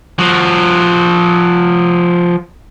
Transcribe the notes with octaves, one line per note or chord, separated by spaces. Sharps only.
F3 F#4